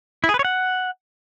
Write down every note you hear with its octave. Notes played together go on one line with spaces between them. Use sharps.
E4
G#4
B4
C#5
F#5